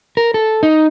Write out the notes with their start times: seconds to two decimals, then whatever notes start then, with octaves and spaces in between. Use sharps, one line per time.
0.17 A#4
0.34 A4
0.63 D#4